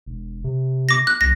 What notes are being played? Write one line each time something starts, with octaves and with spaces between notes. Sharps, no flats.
E1
C3
D6 A#6
F#6
C2 A#6